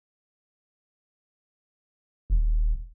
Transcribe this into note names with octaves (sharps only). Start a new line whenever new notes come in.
D#1